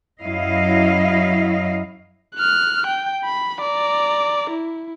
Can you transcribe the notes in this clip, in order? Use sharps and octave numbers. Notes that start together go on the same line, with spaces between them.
F#2 F#3 E4 D#5 F5
F6 F#6
G5
B5
D5 A#5
E4